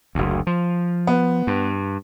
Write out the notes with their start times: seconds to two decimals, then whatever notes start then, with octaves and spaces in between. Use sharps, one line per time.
0.15 F#1 D2
0.47 F3
1.07 B3
1.47 G2